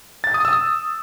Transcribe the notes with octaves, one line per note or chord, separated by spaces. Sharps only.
A6
D#6
E6